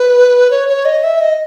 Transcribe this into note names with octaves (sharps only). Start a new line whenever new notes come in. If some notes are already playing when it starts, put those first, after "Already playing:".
Already playing: B4
C#5
C#5
D#5
E5
D#5